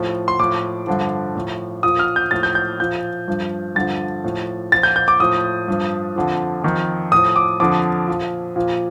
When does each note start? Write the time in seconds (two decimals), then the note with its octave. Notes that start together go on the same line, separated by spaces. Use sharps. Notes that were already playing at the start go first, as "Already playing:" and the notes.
Already playing: A2 F3
0.28 C6
0.39 A2 F3 D6
0.87 G2 D3 F3
1.36 A2 F3
1.83 A#2 F3 D#6
1.99 F6
2.16 G6
2.31 A2 F3 A6
2.43 G6
2.55 G6
2.79 A#2 F3 G6
3.28 G2 F3
3.75 G2 D3 F3 A6
4.24 A2 F3
4.72 A#2 F3 A6
4.83 G6
4.96 G6
5.08 D6
5.20 A2 F3 D#6
5.68 G2 F3
6.16 F2 D3 F3
6.64 F2 D#3
7.12 A2 D#6
7.16 F3
7.36 D6
7.60 F2 D3 F3 D6
8.08 A#2 F3
8.56 A#2 F3